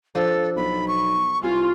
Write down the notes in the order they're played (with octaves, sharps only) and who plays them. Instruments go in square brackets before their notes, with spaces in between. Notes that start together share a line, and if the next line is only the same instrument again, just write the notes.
[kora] F3 D4 [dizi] A4
[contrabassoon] B1 [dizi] B5
[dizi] C#6
[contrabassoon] C2 [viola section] F4 [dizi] G#5